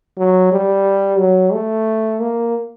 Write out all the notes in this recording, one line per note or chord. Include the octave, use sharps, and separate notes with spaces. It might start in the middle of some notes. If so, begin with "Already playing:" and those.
F#3
G3
F#3
A3
A#3